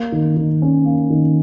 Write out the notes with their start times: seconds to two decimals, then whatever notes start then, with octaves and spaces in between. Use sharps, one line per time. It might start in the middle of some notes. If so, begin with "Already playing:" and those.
Already playing: A#3
0.12 D#3
0.37 D#3
0.62 C#4
0.85 A#3
1.10 D#3